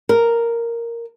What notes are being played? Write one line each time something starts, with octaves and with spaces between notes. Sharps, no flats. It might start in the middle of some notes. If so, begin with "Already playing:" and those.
A#4